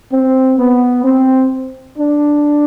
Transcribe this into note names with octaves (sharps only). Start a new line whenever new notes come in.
C4
B3
C4
D4